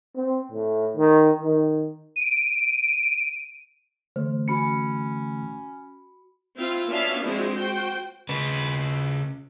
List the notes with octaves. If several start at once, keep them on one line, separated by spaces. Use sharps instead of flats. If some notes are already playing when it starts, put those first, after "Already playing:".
C4
A2
D#3
D#3
D7 D#7
D3 E3 A3 C5
C#4 F#4 B5 C#7
C4 E4 F4 F5
B3 C#4 D4 F#4 E5 F5
F3 G#3 C4 D4 E4 F#4
F#4 C5 G5
C#3 B4